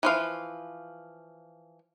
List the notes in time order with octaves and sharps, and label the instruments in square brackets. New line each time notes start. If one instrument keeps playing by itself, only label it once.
[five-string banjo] E3 F3 F5